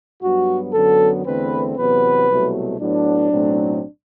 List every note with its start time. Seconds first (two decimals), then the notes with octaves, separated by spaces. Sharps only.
0.22 G2 F#3 B3 F#4
0.73 F#2 D3 F#3 B3 A4
1.25 E2 D3 A3 C4 B4
1.76 E2 C3 F#3 B3 B4
2.28 C2 B2 F#3 A3
2.79 A2 F#3 B3 D4
3.31 B1 A2 F#3 A3 C4